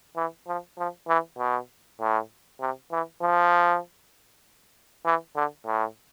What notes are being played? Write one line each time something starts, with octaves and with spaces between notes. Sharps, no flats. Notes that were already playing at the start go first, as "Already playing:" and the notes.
E3
F3
F3
E3
B2
A2
C3
E3
F3
E3
D3
A2